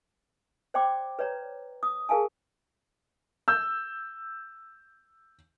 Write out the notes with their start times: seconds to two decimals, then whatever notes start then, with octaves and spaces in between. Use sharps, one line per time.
0.74 C5 D5 G5 C6 D6
1.19 B4 C#5 D5 A#5
1.83 D#6
2.09 G#4 A#4 F5 G#5 A5
3.48 E6 G6